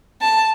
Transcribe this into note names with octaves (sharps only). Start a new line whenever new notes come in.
A5